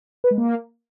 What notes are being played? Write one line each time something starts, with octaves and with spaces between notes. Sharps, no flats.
B4
G#3
A#3